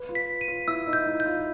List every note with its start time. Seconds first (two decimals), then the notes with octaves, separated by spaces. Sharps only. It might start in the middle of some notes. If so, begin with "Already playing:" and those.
Already playing: B4
0.09 F4
0.15 B6
0.41 D#7
0.48 F4
0.68 E4 E6
0.87 D#4
0.93 G6
1.07 E4
1.20 G6
1.26 F4